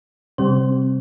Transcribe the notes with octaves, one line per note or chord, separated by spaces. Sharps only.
C3 G3 C4 C5